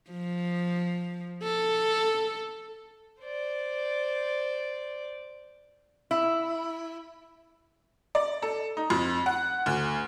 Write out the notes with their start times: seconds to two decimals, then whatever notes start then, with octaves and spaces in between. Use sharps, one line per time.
0.10 F3
1.43 A4
3.21 C5 D5
6.11 E4
8.15 D5
8.42 A4
8.77 D#4
8.90 F2
9.26 F#5
9.66 D2